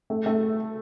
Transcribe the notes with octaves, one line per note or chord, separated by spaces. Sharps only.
A3
A3